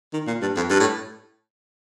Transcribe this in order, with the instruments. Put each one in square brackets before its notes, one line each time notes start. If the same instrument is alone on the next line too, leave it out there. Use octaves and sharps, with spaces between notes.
[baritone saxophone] D#3
A#2
G2
F2
G2
A2